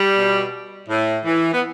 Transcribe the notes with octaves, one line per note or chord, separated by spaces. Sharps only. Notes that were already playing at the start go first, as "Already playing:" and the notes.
Already playing: G3
B2
A2
E3
B3